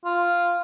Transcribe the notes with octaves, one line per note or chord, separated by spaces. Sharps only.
F4